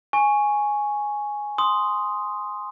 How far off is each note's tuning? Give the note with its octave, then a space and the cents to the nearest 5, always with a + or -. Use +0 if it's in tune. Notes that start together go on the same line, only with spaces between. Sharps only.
G#5 +0 C#6 +0
C6 +0 D#6 +0